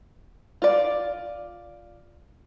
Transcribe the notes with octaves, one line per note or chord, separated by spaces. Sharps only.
F4 D5